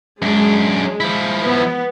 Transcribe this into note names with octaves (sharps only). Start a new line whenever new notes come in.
F#2 G#3 D4
F3 E4
B3